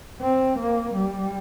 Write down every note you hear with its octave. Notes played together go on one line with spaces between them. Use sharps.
C4
A#3
G3